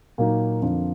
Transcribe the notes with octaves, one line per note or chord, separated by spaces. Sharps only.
A#2 F#3 A#3 D#4
F2 D3 F3 A#3